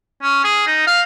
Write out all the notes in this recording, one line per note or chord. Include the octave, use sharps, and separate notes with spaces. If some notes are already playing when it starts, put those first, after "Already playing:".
C#4
G#4
D#4
F5